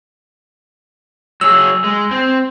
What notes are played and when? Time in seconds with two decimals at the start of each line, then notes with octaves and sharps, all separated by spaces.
1.41 F#3 G#4 E6
1.84 G#3
2.11 C4